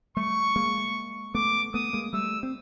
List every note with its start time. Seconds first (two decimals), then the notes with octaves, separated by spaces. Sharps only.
0.16 G3 A3 C#6
0.56 G#3 A#3
1.35 A3 B3 D6
1.74 A3 B3 D#6
1.93 G#3 A#3
2.13 G3 A3 E6
2.43 C4